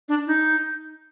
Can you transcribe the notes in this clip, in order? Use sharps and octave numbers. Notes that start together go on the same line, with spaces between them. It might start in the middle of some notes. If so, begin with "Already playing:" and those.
D4
D#4